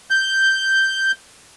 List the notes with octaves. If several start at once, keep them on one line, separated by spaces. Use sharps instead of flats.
G6